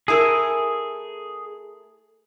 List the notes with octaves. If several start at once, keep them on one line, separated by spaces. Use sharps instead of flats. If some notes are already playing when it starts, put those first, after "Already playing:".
A3 E4 G#4 A#4